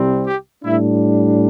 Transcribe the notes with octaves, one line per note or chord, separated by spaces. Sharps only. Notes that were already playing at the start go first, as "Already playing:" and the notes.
Already playing: C2 C3 G3 C4
G4
A2 G3 D4 E4